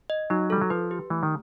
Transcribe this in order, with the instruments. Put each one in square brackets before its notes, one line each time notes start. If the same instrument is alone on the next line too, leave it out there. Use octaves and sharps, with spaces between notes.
[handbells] D#5
[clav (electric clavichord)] F#3 [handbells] D#4
[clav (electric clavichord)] G3 [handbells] A4
[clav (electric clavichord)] F#3
[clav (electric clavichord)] F3 [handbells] B4
[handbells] G4
[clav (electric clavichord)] E3 [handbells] A3
[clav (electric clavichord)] D#3